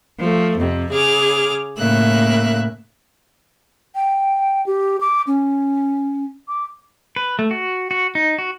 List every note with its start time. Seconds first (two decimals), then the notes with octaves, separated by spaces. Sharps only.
0.19 F3 A3
0.58 F2 C3
0.91 C#3 G#4 D6 F6
1.78 A2 C#3 A#3 E5 F#6
3.95 G5
4.66 G4
5.01 D6
5.27 C#4
6.48 D6
7.16 B4
7.39 A3
7.51 F#4
7.91 F#4
8.15 D#4
8.38 F#4